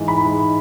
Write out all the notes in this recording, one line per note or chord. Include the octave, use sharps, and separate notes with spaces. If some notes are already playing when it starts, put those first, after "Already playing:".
Already playing: G#2 E3
B5
G#2